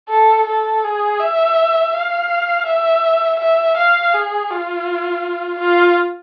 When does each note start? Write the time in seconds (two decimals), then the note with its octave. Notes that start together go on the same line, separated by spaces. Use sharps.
0.09 A4
0.47 A4
0.84 G#4
1.20 E5
1.93 F5
2.66 E5
3.39 E5
3.77 F5
4.14 G#4
4.50 F4
5.59 F4